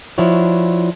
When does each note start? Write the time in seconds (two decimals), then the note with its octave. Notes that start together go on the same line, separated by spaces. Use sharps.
0.18 F3 D4 E4 F#4 C#5